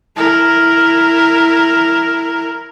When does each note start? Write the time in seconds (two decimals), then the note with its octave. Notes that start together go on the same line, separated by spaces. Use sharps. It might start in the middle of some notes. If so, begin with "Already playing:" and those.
0.16 E4 A#4